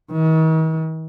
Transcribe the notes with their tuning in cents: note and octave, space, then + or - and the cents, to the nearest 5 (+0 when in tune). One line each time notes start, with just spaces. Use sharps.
D#3 +45